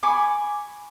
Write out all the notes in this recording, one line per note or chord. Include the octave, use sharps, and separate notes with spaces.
G#5 B5 C#6 D6